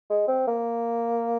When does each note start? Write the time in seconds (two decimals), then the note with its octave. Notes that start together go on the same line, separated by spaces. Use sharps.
0.10 G#3
0.28 C4
0.47 A#3